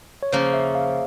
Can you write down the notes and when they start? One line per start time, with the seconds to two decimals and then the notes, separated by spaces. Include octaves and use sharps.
0.23 C#5
0.32 C#3 F3 A#3 C5
0.53 E5
0.75 F5